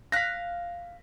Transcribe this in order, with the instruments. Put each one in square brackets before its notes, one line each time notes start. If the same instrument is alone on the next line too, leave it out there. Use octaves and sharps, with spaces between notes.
[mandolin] F5 F#6 [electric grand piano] A#6 B6